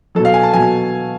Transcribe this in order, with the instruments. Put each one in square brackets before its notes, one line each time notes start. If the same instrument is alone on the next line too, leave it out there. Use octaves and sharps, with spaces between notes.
[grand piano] F#3 A4
B2
F5
G#5
A5
B2 F#3 G#5